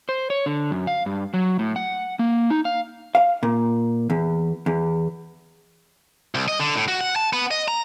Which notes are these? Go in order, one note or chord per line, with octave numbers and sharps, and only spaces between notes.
C5
C#5
D3
F#2
F5
G2
F#3
A2
F#5
A#3
D#4
F5
F5
A#2
E2
E2
C2
D#5
D3
A2
F#4
F#5
A5
B3
D#5
A#5